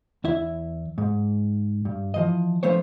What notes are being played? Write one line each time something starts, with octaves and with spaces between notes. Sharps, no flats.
E2 E4 E5
G#2
G2
E3 F3 D#5
F3 A3 B3 D4 C5 C#5